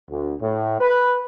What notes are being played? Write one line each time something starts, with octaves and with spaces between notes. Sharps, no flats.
D2
A2
B4